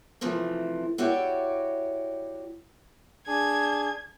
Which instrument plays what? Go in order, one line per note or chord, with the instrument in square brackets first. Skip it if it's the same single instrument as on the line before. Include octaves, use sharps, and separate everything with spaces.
[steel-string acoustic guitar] C3 E3 F3 A3
E4 F#4 G4 C#5 D5
[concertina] D4 G#4 [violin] G#6